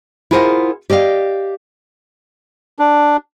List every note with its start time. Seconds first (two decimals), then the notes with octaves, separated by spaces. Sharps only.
0.31 E4 F4 G#4 A#4 C5 F#5
0.90 G4 D5 D#5 F5
2.79 D4